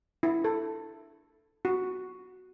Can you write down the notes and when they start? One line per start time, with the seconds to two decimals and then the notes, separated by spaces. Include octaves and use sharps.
0.23 E4
0.44 A4
1.65 F#4